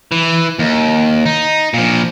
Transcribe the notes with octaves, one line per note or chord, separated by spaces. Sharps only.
E3
D#2
D#4
A#2 F3